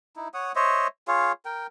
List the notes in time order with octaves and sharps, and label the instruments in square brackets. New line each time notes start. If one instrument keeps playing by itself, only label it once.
[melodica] D#4 E4
C#5 F#5 D#6
C5 C#5 D#5 E5
F4 G#4 C#5 F5
A#4 G5